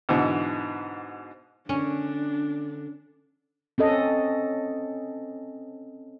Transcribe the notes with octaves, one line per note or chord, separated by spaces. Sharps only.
G#2 B2 D3 E3
D3 C#4 D4
C4 C#4 A4 D#5